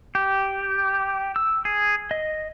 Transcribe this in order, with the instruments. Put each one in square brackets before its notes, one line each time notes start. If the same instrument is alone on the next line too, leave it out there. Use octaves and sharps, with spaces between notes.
[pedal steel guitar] G4
E6
G#4
D#5